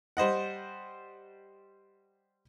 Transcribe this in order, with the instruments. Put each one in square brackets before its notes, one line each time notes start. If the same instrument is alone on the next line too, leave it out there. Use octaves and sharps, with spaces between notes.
[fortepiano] G3 C5 D#5 F#5